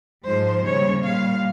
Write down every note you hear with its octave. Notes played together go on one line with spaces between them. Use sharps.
G#2 F3 G#3 C5
D#2 C#3 G3 C#5
A#2 G3 F5